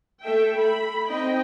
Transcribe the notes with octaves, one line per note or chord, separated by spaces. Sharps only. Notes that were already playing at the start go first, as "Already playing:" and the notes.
A3 A4 E5 G5
B5
C4 D#4 D#5 G5